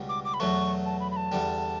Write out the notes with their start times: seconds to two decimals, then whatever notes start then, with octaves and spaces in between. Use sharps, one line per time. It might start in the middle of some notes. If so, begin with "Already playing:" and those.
Already playing: C#2 B2 G3
0.09 D6
0.25 D6
0.34 B5
0.40 E2 B2 F#3 A3 C#6
0.86 A5
1.00 B5
1.11 B5
1.16 A5
1.32 E2 D3 G3